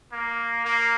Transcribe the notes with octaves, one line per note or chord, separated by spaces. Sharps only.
A#3
A#3